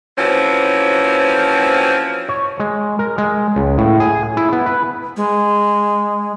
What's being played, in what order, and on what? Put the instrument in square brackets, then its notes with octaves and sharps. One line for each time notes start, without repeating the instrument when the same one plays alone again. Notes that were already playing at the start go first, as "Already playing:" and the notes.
[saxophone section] E3 F3 A#3 C4 C#4 F#4
[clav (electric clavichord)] C#5
G#3
A#4
G#3
C#2
A2
G#4
E4
B3
B4
[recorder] G#3